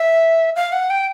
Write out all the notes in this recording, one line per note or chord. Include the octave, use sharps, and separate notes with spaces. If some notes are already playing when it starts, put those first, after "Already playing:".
Already playing: E5
F5
F#5
G5